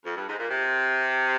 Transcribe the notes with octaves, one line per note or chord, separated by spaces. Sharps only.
F2
G2
G#2
A#2
C3